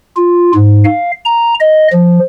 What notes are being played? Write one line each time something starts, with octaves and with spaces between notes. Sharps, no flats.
F4
G#2
F5
A#5
D#5
F3